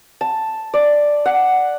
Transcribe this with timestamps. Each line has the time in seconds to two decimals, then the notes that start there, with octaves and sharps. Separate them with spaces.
0.21 A5
0.74 D5
1.25 F#5